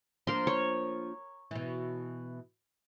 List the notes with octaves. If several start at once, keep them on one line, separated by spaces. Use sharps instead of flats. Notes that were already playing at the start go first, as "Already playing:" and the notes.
F3 A#3 D4 A#4 C6
C#5
B2 E3